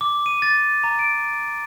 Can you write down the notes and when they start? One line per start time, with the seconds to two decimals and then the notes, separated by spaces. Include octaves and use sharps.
0.01 D6
0.26 D#7
0.42 A6
0.84 A#5
0.99 D7